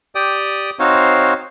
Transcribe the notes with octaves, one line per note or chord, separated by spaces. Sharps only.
G4 D5 G5 D#6
C4 D#4 F#4 C5 C#5 F5